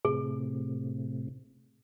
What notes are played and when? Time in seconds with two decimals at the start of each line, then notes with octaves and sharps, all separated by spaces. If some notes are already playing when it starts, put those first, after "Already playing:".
0.05 A2 C3 G#4